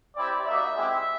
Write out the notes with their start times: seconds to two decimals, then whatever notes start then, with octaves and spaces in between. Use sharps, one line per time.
0.16 C4 E4 G4 D5
0.47 A#3 D#4 F#4 E5
0.76 G#3 C4 E4 G4